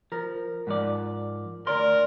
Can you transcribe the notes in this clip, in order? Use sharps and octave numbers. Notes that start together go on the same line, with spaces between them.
F3 A#4
G#2 F3 D5
D2 A#4 D5 C6